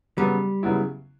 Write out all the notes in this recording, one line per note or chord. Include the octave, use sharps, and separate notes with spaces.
C#3 F#3 G3 B3
C#3 F#3 B3 E4